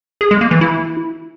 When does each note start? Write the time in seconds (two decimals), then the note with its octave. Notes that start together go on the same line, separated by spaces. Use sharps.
0.21 G#4
0.31 G#3
0.41 A#3
0.51 E3
0.61 E4